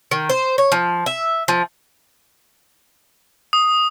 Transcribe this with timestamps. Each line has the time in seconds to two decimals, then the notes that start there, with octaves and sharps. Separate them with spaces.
0.11 D#3
0.30 C5
0.58 C#5
0.72 F3
1.06 E5
1.48 F3
3.53 D#6